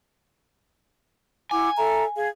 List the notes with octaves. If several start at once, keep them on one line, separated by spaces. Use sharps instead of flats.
E4 F#5 G#5 D6
A4 E5 A#5
G#4 F5